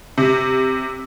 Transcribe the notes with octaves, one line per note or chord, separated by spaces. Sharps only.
C3